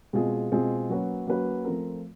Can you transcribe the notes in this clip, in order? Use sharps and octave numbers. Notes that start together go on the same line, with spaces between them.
B2 G#3 C4 F4 G#4
B2 G#3 C4 F4 G#4
F#3 A#3 C#4 F#4 B4
F#3 A#3 C#4 F#4 B4
F3 A3 C4 F4 A#4